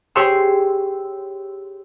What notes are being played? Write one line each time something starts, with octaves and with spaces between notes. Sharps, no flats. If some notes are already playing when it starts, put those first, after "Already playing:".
G4 G#4 C#5 G5 C6 E6